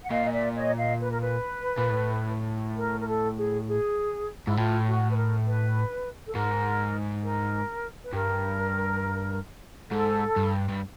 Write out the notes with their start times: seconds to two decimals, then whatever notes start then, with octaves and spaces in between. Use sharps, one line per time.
0.02 F#5
0.10 A#2 D#5 F5
0.25 D#5
0.33 D5 E5
0.55 C#5 D#5
0.77 D#5 F5
1.01 B4
1.11 A#4
1.21 B4
1.78 A#2
1.90 A2
2.78 A#4
3.00 A#4
3.08 A4
3.37 G#4
3.67 G#4
4.45 G#2 E4
4.57 A2 F4
4.87 F#4
5.11 B4
5.15 A#4
5.46 B4
6.27 A4
6.34 G#2 A#4
7.24 A#4
8.02 B4
8.13 G2 A#4
9.91 G#2 A4
10.36 G2
10.69 G2